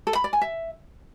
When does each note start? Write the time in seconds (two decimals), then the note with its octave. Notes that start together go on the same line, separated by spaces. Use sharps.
0.07 A4
0.15 B5
0.24 D5
0.33 G#5
0.42 E5